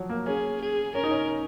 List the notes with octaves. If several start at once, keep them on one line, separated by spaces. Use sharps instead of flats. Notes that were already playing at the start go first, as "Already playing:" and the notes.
Already playing: F3 F#3
A#3
C#4 G#4
G#4
C#4 A#4
D#4
C#4